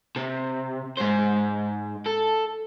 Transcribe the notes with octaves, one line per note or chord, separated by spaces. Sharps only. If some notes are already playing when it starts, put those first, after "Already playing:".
C3
G#2 C5
A4